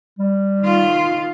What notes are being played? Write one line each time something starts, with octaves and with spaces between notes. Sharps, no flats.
G3
D#3 F4